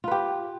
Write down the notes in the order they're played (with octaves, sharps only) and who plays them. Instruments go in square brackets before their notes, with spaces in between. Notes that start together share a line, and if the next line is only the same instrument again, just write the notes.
[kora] F4
B4
G4